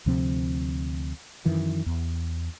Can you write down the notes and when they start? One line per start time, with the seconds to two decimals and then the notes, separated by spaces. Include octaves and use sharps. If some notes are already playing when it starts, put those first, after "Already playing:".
0.06 D2 C3 F3 C4
1.45 F#2 D#3 E3
1.86 E2